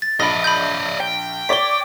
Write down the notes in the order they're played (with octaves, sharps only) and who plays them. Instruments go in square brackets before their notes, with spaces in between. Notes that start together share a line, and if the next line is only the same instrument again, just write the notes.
[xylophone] A6
[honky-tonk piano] A#1 [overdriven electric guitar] D5 D#5 [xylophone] B5 A#6
[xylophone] B5 G6
[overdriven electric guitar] G5
[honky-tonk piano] C#5 D5 D6 [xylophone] B6 G7